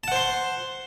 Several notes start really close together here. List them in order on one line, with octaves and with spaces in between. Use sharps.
A5 F#5 C5 C6